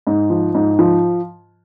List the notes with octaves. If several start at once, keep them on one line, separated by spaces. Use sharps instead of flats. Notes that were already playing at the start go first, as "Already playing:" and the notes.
G#2
F3
G#2
F3